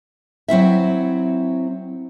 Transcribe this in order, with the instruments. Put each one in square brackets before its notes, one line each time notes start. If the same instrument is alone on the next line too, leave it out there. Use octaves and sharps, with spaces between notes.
[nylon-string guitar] F#3 C4 E4 E5